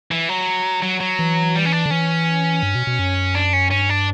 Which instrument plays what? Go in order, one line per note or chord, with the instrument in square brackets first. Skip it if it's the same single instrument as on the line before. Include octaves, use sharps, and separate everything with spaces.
[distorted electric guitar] E3
F#3
F#3
F#3
[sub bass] E3
[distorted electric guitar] G3
C#4
D4
[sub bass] D3
[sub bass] E3 [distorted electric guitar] C#4
[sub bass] G2
B2
B2
F#2
[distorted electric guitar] D4
C#4
[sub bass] G2 [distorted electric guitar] C#4
[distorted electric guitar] D4